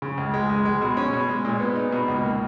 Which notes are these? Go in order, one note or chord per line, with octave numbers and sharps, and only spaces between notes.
C#3
C#2
G#3
C#2
G#3
B2
C#4
B2
G#3
A#2
B3
D#4
B2
C#2
A#3